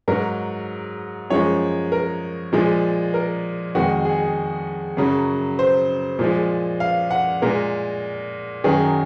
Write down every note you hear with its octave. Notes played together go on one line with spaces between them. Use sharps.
G#2 F#3 A#4
F#2 F3 G#3 C#5
A#4
A#2 F3 G#3
A#4
F2 D#3 G#3 F#4
G#4
F#2 C#3 F#3
C5
A#2 F3 G#3
F5
F#5
A#2 G#3 A#4
F#2 D#3 F#3 G#4